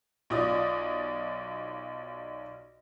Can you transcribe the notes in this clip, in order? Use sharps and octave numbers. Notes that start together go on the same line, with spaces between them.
B1 F4 D5 D#6